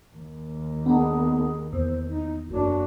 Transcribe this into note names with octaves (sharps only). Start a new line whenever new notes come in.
D#2
B3 D4 D#4 G#4
E2 C5
D#4
F#1 D4 F#4